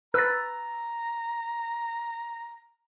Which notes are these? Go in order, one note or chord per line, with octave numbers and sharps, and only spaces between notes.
B4 A#5 E6 A6